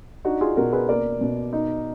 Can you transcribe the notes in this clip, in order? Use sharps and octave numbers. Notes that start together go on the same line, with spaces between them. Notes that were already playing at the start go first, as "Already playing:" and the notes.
D4 D#4 F#4
F4 G#4
B2 F#4 A#4
G#4 B4
A#3 A#4 D5
B2
D#4